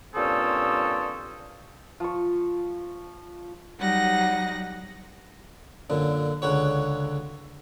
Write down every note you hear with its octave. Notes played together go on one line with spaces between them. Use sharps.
G2 A#2 C4 C#4 A4 D#6
F3 C#6
F#3 G3 D#4 F#5 A#6
F#2 A#2 D3
C#2 D3 F#4 C#5